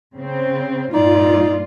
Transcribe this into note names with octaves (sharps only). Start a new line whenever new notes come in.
C#3 C4
G2 A#2 D#4 F4 D5